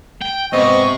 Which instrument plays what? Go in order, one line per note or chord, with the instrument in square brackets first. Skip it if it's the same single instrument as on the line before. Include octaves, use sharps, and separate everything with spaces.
[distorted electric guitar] G5
[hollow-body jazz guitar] G#2 B3 C4 [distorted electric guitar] C3 [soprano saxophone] D#5 [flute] C#6